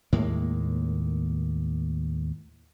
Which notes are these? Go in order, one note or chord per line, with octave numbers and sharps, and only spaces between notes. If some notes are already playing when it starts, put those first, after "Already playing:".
D#2 A2 G#3 A#3